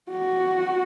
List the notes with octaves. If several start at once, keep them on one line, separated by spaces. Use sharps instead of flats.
F#4